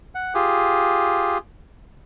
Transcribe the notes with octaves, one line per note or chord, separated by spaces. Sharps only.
F#5
F4 G4 G#4